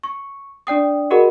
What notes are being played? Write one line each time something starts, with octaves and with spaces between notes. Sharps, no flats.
C#6
D4 D5 G5 D#6
F#4 G#4 A#4 D#5 F#5 B5